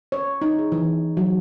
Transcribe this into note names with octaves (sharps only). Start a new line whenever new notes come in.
C#5
D#4
G#4
E3
F#3